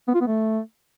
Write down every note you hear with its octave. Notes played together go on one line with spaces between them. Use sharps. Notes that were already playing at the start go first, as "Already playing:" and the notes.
B3
F4
B3
A3